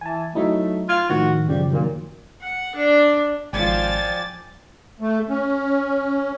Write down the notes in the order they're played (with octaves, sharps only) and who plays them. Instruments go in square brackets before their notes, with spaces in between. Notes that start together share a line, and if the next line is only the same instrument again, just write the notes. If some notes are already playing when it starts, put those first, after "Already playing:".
[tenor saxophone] E3 [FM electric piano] G#5 A5
[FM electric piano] F#3 D#4 E4 [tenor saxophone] A3
[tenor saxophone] F4 [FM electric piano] G#6
[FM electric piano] A2 D#3 F3 [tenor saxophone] F#4
[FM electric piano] F#2 C#3 F3 [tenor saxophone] G3
[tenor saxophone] A#2 [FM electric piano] D#3 F#3 A#3
[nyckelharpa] F#5
D4
[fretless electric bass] G#1 [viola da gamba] F3 [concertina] D5 G5 G#5 [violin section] A6
[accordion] A3
C#4